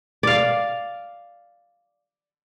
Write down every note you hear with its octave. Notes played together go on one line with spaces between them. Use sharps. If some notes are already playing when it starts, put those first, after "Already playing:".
D5 F5